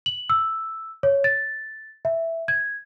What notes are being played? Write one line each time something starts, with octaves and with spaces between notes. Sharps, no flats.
F#7
E6
C#5
A6
E5
G#6